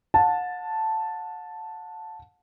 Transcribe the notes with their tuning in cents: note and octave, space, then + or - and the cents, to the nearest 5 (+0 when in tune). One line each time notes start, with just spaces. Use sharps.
F#5 -40 A5 +0